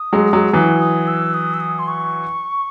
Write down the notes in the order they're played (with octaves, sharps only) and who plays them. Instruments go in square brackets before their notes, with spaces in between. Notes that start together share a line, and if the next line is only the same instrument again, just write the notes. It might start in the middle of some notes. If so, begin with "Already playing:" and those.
Already playing: [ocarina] D#6
[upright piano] F#3 G#3
F#3 G#3
[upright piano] E3 F#3 [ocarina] D#6
[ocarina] D#6
E6
D#6
E6
D#6
C6
C#6